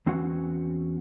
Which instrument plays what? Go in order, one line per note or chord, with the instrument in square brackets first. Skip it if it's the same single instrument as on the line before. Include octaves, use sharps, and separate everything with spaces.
[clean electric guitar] E2 C4 C#4 F#4 F#5